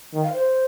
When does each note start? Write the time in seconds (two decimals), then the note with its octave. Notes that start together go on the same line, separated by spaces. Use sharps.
0.14 D#3
0.23 F5
0.33 C5